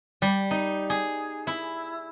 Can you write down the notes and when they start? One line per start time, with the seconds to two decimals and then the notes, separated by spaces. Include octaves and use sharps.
0.22 G3
0.51 D#4
0.90 G#4
1.47 E4